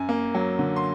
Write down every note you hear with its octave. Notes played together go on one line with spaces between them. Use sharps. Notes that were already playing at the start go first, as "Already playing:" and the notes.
Already playing: F#2 G#5
A#3
F#3
D3
C6